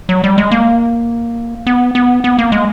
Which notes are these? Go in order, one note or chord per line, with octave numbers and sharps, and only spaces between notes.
F#3
G3
G#3
A#3
B3
B3
B3
A#3
G#3